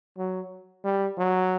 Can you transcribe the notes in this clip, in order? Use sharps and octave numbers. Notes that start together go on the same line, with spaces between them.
F#3
G3
F#3